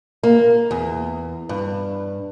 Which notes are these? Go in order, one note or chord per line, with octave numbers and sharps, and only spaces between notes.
A#3
E2
G2